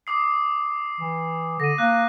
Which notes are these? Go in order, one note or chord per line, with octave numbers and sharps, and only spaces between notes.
D6 D#6 C7
E3
D3 A#6 D#7
A#3 F#6